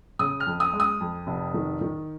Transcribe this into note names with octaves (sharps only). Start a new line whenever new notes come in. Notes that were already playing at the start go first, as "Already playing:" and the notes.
C#3 D#6
F6
F2
D#6
G#3
D#6
F2
F1
D#3
D#3